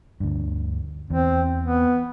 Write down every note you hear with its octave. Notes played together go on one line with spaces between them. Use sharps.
D2 G2
E2 C4
B3